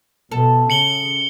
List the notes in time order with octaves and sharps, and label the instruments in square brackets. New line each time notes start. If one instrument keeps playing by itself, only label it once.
[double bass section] B2 [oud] A4
[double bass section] C#3 [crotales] C#7 F#7 G7